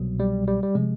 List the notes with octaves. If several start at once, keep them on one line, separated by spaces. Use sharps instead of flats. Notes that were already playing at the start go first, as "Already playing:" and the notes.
Already playing: C2 B2 F#3
G3
G3
G3
C3 F3 G#3